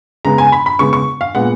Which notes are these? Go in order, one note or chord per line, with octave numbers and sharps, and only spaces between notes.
C#3 G#3 B3 A#5
G#5
B5
B5
C#3 G#3 B3 C#6
C#6
F5
A#2 G#3 B3 F#5